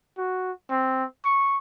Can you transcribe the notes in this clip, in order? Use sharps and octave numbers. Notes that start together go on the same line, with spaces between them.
F#4
C4
C#6